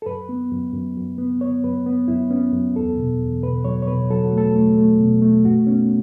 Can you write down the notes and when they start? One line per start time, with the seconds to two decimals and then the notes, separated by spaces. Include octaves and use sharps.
0.02 A4
0.06 F#2 B4
0.29 B3
0.52 F#2
0.73 F#2
0.97 F#2
1.18 B3
1.41 B3 C#5
1.64 F#2 B4
1.86 B3
2.08 F#2 E4
2.30 B3 C#4
2.53 F#2
2.76 E2 A4
2.98 B2
3.21 E2
3.43 B2 B4
3.65 F#3 C#5
3.82 C#5
3.87 B2 B4
4.11 F#3 A4
4.24 F#4
4.32 A3
4.38 A4
4.55 A3
4.77 A3
4.99 B2
5.22 A3
5.44 F#2 F#4
5.66 B3 C#4